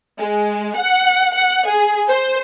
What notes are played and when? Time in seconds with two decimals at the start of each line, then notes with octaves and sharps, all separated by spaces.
0.19 G#3
0.76 F#5
1.35 F#5
1.68 G#4
2.09 C5